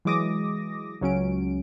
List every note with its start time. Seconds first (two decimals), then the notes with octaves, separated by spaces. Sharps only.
0.05 E3 F#3 G#3 D6 D#6 A#6
1.01 C#2 F#3 C#4 D7